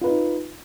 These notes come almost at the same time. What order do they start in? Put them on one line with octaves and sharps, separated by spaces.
F4 B4 D#4